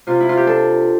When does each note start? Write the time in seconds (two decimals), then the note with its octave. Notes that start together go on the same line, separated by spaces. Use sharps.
0.07 C3 F4
0.21 E4
0.29 F4
0.37 G4
0.46 D4 A4